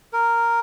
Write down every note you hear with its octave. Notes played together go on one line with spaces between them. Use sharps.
A#4